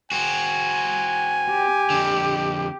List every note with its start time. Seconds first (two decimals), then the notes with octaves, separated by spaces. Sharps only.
0.12 C4 F#4 G#5
1.50 G4
1.90 F2 D3